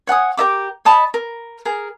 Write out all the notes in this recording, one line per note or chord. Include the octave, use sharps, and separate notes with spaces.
C#5 F#5 G#5 D#6
G4 A#4 E5 D6
C#5 D#5 A5 B5
A#4
G#4 A#4